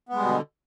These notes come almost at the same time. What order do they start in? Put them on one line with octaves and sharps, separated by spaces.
B3 G#3 G3 B2 D3